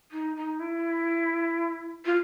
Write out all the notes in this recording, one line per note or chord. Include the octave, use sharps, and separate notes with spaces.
D#4
D#4
E4
F4